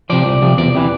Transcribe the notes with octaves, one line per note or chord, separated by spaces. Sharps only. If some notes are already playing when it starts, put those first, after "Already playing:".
C3 F3 D5
C2
C3 F3
E2 D5
C3 E3